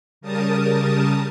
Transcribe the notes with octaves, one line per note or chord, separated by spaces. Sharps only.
C#3 G3 A#4 A5 D#6